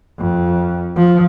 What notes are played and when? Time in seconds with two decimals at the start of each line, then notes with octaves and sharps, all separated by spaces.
0.18 F2
0.96 F3